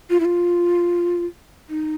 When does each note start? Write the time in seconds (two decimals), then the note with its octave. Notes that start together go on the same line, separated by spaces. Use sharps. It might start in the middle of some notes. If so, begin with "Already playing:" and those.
0.10 F4
0.20 E4
0.25 F4
1.70 D#4